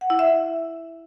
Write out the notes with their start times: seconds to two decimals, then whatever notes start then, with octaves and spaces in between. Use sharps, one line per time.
0.01 F#5
0.10 E4
0.19 E5